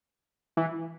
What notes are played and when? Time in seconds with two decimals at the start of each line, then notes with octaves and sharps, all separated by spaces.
0.57 E3